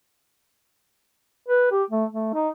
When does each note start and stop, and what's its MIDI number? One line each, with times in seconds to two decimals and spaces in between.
1.49 1.68 71
1.72 1.83 67
1.90 2.05 57
2.13 2.31 57
2.34 2.49 63